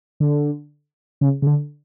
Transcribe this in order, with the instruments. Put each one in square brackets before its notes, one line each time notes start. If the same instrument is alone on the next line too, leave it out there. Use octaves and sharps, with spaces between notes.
[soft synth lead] D3
C#3
C#3
D3